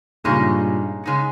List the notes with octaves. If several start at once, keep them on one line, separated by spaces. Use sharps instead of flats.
G2 A#2 C#3 G#3 D#4
C#3 G#3 D#4